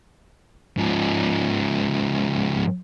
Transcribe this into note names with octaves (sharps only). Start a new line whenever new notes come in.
G#2 F3